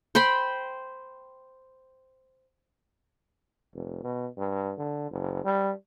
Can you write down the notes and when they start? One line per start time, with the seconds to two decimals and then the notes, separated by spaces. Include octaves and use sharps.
0.15 C5 G5 B5 C6
3.74 F1
4.04 B2
4.37 G2
4.78 D3
5.11 F#1
5.44 G3